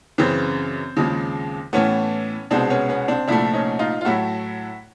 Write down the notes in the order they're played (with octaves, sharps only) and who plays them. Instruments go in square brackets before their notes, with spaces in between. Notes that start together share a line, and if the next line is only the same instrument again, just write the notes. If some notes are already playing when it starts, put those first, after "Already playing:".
[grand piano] F#2 C#3 E3 C4
D#2 C#3 F3 G#3
A2 E3 A3 B3 C#4
C2 B2 G#3 C4 D4
B3 C#4
B3 C#4
C4 D4
C2 A#2 F3 A3 D4 E4
C#4 D#4
D#4 F4
F4
A2 F#3 A3 E4 F#4